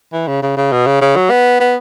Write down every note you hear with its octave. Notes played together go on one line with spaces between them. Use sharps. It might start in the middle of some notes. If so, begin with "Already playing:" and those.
E3
C#3
C#3
C#3
B2
C#3
C#3
F#3
B3
B3